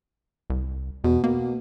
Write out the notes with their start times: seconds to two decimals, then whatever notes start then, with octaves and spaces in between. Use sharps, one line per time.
0.50 C2
1.04 E2 B2
1.24 B2 A#3